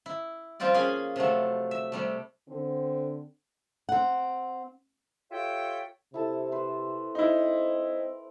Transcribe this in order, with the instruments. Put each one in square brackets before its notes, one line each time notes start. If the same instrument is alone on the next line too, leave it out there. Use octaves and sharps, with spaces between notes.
[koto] E4
F3 G3 C4 F4 G4 D5
A#3 C#4 G#4 G#5
C3 F3 F#3 A3
E5
C3 G3 A3
[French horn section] D3 C4
[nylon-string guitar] C4 F#5
[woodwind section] F4 G4 A4 C#5 E5 G5
[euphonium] C3 [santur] E4 A4 A5
[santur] B4 C5
[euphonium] C4 [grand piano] D#4 E4